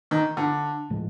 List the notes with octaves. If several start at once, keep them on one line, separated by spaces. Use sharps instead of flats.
D#3
D3
A2 F3 G#3